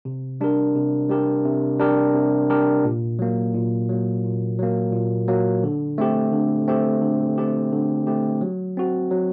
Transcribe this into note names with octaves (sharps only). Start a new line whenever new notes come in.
C3
G3 D4 G4 A#4
C3
G3 D4 G4 A#4
C3
G3 D4 G4 A#4
C3
G3 D4 G4 A#4
A#2
F#3 A#3
A#2
F#3 A#3
A#2
F#3 A#3
A#2
F#3 A#3
D3
A3 C4 G4
D3
A3 C4 G4
D3
A3 C4 G4
D3
A3 C4 G4
F#3
C4 F#4
F#3